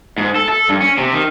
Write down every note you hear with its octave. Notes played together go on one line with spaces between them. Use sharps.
G#2
A4
A4
G2
C#4
C3
D#3